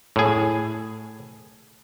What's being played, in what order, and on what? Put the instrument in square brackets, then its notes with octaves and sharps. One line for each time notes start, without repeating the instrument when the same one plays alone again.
[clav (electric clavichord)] A2 G#4